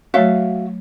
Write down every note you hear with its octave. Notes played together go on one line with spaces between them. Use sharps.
F#3 A3 F#4 C#5 E5 F5